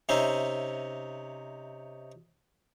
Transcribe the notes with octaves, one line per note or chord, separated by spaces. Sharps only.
C3 C#4 D#4 C5 E5